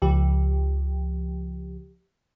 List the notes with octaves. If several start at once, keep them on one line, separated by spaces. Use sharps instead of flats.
C#2 F3 G4